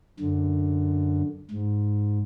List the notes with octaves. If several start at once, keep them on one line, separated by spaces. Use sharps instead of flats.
F#2 D3
G#2